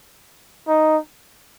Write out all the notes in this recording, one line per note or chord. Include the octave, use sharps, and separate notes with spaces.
D#4